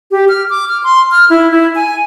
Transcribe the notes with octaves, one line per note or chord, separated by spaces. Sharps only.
G4
F6
D6
F6
C6
F6
E4
E4
G#5